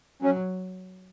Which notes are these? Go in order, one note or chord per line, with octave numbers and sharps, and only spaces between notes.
F#3 C#4